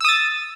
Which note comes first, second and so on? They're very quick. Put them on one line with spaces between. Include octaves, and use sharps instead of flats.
E6 D#6 A6